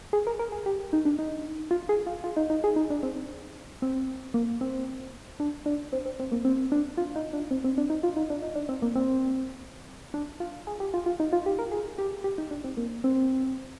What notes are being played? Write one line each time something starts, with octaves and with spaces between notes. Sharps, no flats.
G#4
A#4
A#4
G#4
G4
D#4
D4
D#4
F4
G#4
F4
F4
D#4
D#4
G#4
D#4
D4
C4
C4
A#3
C4
D4
D4
C4
C4
C4
A#3
C4
D4
F4
D#4
D4
C4
C4
D4
D#4
F4
D#4
D4
D#4
D4
C4
A#3
C4
D4
F4
G#4
G4
F4
F4
D#4
F4
G4
A#4
G#4
G4
G4
D#4
D4
C4
A#3
C4